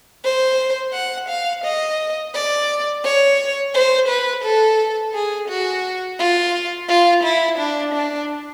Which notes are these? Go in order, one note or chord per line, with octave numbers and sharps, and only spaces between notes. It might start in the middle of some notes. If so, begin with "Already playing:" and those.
C5
F#5
F5
D#5
D5
C#5
C5
B4
A4
G#4
F#4
F4
F4
E4
D4
D4